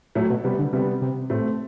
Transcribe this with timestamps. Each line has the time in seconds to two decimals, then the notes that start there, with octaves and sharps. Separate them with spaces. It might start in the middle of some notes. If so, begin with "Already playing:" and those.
0.15 A2 F#3 A3
0.30 B2
0.44 C3 G3 B3
0.59 D3
0.73 C3 G3 B3
1.01 C3
1.30 A2 A3 C4